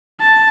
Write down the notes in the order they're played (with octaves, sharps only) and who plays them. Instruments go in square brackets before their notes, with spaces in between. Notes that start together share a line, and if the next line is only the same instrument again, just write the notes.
[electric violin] A5